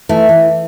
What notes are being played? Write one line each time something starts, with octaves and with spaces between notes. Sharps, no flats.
E3 A3
E3